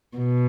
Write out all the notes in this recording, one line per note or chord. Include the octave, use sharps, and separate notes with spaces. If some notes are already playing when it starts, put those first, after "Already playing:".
B2